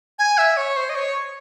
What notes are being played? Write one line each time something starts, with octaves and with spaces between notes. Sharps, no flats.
G#5
E5
C#5
C5
D#5
C#5